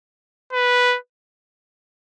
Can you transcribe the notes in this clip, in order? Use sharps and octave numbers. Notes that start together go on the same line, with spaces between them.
B4